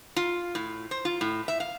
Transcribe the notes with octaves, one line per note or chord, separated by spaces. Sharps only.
F4
A2
C5
F4
A2
E5
F5